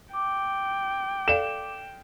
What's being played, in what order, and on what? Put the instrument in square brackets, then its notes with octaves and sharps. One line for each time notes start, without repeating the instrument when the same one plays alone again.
[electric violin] G5 [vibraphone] D6
[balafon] A4 D5 F5 [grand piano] E7